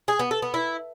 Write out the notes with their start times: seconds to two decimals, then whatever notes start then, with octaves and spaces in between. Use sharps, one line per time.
0.08 G#4
0.19 B3
0.31 A4
0.42 B3
0.54 E4